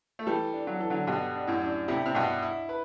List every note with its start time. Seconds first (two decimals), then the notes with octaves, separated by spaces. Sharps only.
0.19 A3
0.27 E3 G3 A4
0.54 D4
0.67 F#3
0.79 E3 A4
0.90 D3 F#3
1.07 G2 B2 G3
1.35 D4
1.47 F#2 A2
1.62 D4
1.88 A2 C3 E4
2.06 C3
2.15 G2 B2 E4
2.42 E4
2.69 B4